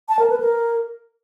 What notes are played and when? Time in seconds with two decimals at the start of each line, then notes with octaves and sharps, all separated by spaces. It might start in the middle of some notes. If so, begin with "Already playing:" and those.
0.09 A5
0.19 A#4
0.30 B4
0.40 A#4